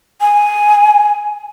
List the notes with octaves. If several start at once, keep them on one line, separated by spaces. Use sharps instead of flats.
G#5